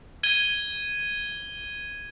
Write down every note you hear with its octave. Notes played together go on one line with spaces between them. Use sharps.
G#6 D#7 G7